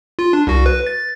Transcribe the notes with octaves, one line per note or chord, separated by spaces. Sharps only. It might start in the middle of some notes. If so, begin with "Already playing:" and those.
F4
D4
C2 F#4
B4
A6